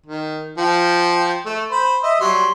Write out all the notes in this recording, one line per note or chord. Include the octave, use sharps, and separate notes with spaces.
D#3
F3 F4 G5
A3
C5 B5
D#5 E5
F#3 G3 C6